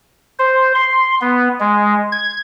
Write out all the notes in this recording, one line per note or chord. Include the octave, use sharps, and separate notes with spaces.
C5
C6
B3
G#3
G#6